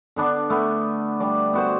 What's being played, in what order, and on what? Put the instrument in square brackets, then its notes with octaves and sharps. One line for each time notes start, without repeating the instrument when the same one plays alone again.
[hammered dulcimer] D3 B3 D4
A3 B3
G3 D4 D5
B3 F#4 C5